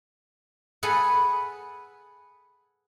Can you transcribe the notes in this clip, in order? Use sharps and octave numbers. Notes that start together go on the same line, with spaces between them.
G#4 A4 B4 F#5